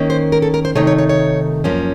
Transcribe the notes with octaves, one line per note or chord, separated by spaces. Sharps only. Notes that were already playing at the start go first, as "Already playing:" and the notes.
Already playing: D#3 A#3 C#4
C5
A#4
A4
A#4
C5
C3 D#3 A3 D#4 C#5
C#5
C#5
C#5
F#2 F3 A#3 C#4